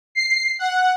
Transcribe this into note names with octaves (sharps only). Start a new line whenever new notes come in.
C7
F#5